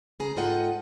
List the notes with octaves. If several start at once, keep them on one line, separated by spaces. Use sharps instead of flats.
C#3 G#4 A#5
G#2 F4 A4 D#5 F#5 G5